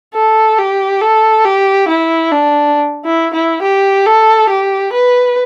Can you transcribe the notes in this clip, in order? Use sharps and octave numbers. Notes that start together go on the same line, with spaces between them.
A4
G4
A4
G4
E4
D4
E4
E4
G4
A4
G4
B4